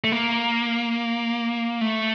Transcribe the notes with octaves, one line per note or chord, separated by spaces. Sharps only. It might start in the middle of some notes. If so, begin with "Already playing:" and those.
A3
A#3
A3